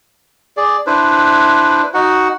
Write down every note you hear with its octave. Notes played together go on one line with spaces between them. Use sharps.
G#4 D5
D4 E4 B4 C5
D#4 F#4 F#5